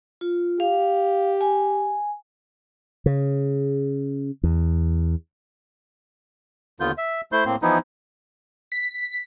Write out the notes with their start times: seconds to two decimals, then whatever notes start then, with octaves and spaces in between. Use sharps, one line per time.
0.21 F4
0.60 G4 F5
1.41 G#5
3.06 C#3
4.43 E2
6.80 D#2 D3 B3 F4 G6
6.98 E5
7.32 A3 E4 C5 C6 G6
7.45 A2 A#3 C4 C6
7.62 E3 F3 B3 D#4 E4
8.72 B6